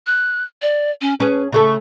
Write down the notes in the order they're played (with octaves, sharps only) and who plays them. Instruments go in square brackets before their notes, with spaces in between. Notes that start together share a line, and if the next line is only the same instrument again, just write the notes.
[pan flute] F#6
D5
C#4
[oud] C#4 G#4 [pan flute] B4
[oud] C#3 A3 A4 [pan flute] C#6